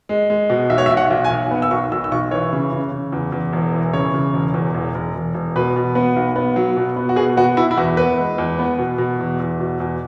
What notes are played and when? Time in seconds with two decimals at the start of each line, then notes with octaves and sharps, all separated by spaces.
0.09 G#3
0.30 G#3
0.50 B2
0.70 B1 E5
0.78 C#5
0.86 E5
0.90 B1
0.97 F#5
1.11 B1
1.24 G#5
1.30 B1
1.51 B3
1.62 E6
1.71 B1 C#6
1.92 B1 E6
2.04 E6
2.11 B1 C#6
2.31 E3 C#5
2.53 C#3
2.73 C#3
2.92 C#3
3.12 E2
3.32 E2
3.53 E1
3.74 E3
3.93 C#3 C#5
4.14 C#3
4.33 E1
4.54 E2
4.74 E1
4.95 E1
5.15 E1
5.34 E1
5.56 B2 B4
5.76 B2
5.95 B3
6.16 B1
6.36 B3
6.56 F#3
6.77 B2
6.96 B3
7.09 F#4
7.16 B2 G#4
7.37 B3 F#4
7.57 B2 E4
7.71 E4
7.77 E2 F#4
7.97 B3 B4
8.18 G#3
8.38 E2
8.59 B3
8.79 B2
8.98 B2
9.19 E2
9.40 E2
9.59 B2
9.80 E2